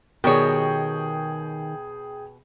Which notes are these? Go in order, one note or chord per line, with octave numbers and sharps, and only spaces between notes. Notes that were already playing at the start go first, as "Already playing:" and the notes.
B2 D#3 G4 G#4 A#4 C#5 G5